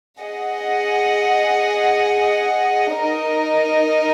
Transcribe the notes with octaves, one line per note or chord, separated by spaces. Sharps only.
G#4 D#5 F#5
D#4 A#4 D#5